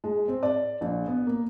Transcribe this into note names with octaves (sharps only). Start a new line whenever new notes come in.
G#3
C4
D5
A#1
B3
A#3